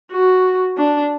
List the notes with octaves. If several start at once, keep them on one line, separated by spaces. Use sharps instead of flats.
F#4
D4